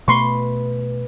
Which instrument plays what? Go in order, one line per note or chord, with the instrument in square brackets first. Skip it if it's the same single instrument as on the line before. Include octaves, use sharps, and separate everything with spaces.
[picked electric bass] B2 A3 [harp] B4 [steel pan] C6 C#6